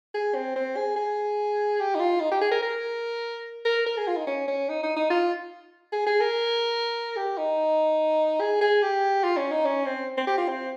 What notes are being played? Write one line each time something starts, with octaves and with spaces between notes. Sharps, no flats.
G#4
C4
C4
G#4
G#4
G4
D#4
F4
D#4
G4
G#4
A#4
A#4
A#4
A#4
G#4
F4
D#4
C#4
C#4
D#4
D#4
D#4
F4
G#4
G#4
A#4
G4
D#4
G#4
G#4
G4
F4
C#4
D#4
C#4
C4
C4
G4
F4
C4